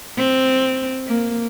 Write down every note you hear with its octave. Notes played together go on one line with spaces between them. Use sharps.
C4
A#3